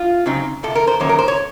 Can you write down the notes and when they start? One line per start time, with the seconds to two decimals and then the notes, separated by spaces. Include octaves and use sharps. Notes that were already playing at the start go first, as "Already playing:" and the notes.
Already playing: F4
0.26 C#3 F#3 C4 D#4
0.63 F2 C3 A4
0.75 A#4
0.87 C5
1.00 F#2 D#3 A#3 C#5
1.09 A#4
1.19 C5
1.28 C#5